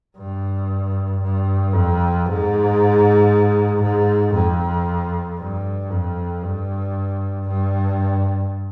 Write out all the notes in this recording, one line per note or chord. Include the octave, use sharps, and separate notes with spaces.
G2
G2
F2
G#2
G#2
F2
G2
F2
G2
G2